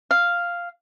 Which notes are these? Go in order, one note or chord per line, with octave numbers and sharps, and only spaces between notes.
F5